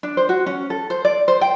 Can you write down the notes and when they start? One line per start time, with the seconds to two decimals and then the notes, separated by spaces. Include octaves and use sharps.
0.03 D4
0.17 C5
0.29 F#4
0.46 C#4
0.70 A4
0.90 C5
1.05 D5
1.28 C5
1.41 G5